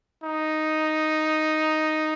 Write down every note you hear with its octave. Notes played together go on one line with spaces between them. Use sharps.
D#4